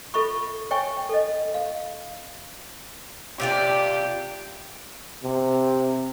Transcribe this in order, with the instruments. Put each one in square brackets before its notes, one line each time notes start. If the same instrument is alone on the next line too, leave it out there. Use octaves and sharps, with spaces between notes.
[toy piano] F4 A4 E5 B5 C#6
C#5 E5 G5 G#5 C#6
A4 D#5
F5
[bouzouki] C3 F4 D5 [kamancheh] G4
[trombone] C3